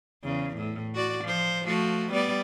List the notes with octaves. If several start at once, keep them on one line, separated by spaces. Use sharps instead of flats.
E2 C#3
A2
F#4 D5
F3 C5
F3 A3 F#4
G3 B3 D5